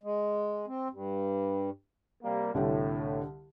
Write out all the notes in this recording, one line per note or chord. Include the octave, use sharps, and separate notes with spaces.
G#3
C4
G2
C3 G3 A#3
C2 A2 D3 G4